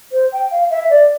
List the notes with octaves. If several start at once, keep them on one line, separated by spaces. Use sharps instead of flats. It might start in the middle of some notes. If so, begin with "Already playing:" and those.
C5
G5
F5
E5
D5